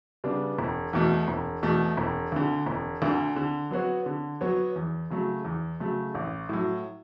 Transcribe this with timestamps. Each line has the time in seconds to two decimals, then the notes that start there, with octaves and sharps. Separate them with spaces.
0.24 C#3 G3 B3 D4
0.59 E1
0.93 E2 B2 A3
1.28 E1
1.63 E2 B2 A3
1.97 E1
2.32 D2 D3
2.66 E1
3.02 D2 D3
3.36 D3
3.71 F#3 B3 F#4 C#5
4.06 D3
4.41 F#3 B3 F#4 C#5
4.76 E2
5.10 C#3 F#3 A3
5.45 E2
5.80 C#3 F#3 A3
6.15 A1
6.49 A2 F#3